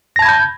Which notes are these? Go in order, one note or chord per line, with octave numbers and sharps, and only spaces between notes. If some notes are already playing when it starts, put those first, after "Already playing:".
A5 B5 G6 G#6 A#6